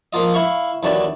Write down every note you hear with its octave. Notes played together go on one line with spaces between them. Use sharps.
F3 A#3 F4 D#5
E4 F5 C#6
D#2 E3 F#3 D4 D5 A5